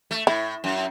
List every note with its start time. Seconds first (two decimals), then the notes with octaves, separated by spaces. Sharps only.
0.11 A3
0.27 A2 E4
0.64 F#2